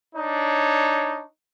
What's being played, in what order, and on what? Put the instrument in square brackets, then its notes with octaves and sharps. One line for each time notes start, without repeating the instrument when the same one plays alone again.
[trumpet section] D4 D#4 C#5